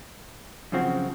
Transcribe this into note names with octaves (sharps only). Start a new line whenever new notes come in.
F#2 C#3 F3 C4 F#4